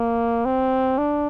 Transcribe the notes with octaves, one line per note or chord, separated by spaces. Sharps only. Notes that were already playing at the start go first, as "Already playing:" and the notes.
Already playing: A#3
C4
D4